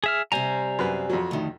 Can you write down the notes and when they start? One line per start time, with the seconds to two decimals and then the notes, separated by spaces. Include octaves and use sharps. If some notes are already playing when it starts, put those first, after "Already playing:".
0.04 G#4 E5 F6
0.32 C3 G3 C5 G#5 A#5
0.79 F#2 B4
1.10 F2 F#3
1.31 D2 D#3